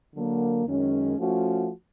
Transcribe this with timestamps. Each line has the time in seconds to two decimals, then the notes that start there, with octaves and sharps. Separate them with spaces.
0.15 D3 F#3 A#3
0.67 F#2 D#3 G#3 C#4
1.18 F3 A3 C#4 F#4